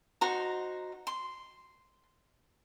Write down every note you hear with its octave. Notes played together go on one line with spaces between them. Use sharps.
D#4 F#4 C5 A#5
C6